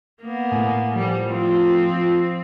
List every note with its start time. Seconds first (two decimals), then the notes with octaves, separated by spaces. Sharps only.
0.22 A#3 B3
0.52 A2 G#5
0.96 F3 G3
1.29 F3 C4 F4